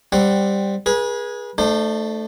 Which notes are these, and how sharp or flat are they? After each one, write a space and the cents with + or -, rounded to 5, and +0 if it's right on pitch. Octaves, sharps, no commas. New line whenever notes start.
G3 +10 C4 +0 F#5 +0
G#4 -5 B4 -40
A3 +0 D4 +40 C5 -15